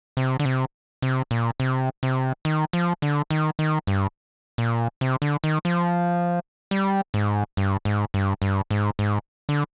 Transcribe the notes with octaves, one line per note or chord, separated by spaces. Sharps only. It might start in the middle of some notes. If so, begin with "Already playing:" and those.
C3
D3
C3
C3
A#2
C3
C3
D#3
F3
D3
D#3
D#3
G2
A#2
C3
D3
D#3
F3
G3
G#2
G2
G#2
G2
G2
G#2
G#2
D3